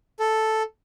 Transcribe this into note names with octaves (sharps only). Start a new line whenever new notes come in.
A4